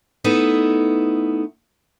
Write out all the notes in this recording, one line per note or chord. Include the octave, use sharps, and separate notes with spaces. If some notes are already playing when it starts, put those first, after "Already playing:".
A3 B3 D#4 E4